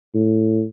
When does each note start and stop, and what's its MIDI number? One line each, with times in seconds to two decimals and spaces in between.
0.14 0.63 45